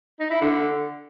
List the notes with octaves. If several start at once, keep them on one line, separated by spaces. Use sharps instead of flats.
D#4
E4
D3